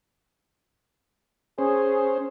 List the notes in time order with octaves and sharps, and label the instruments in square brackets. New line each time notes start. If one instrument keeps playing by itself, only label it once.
[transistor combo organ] C#4 C5 [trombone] G#4